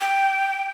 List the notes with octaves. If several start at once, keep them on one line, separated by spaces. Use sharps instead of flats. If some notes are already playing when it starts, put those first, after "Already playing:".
G5